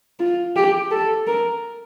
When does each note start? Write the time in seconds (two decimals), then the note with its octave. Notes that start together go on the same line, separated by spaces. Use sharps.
0.20 F4
0.56 G4
0.91 A4
1.27 A#4